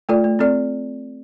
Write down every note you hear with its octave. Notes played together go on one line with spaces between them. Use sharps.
A3 F4 A4 D5
A3
C4 A4 D5